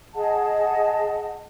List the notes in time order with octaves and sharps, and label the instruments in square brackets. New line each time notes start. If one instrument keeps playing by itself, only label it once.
[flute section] G#4 D#5 F#5 A5